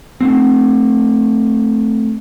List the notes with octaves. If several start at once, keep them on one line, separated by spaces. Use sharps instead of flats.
A3 C4